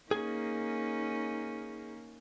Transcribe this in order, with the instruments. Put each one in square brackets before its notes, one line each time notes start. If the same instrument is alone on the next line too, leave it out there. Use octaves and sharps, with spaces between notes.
[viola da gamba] A#3 C#4 D#4 [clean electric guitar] G#4 G#5